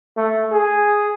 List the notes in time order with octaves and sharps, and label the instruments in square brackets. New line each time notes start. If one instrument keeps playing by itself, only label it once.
[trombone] A3
G#4